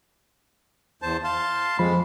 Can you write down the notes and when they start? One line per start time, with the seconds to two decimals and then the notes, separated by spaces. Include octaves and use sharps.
1.02 E2 C5 A5
1.24 F5 A5 C6
1.79 F2 F3 G#3 B5